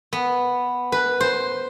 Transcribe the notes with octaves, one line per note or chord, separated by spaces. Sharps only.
B3
B4
C5